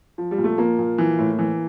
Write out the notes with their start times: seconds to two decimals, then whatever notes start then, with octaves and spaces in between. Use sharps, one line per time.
0.18 F3
0.31 G3
0.38 A#2
0.44 A3
0.58 F3 A#3
0.78 A#2
0.98 E3
1.18 A2
1.38 E3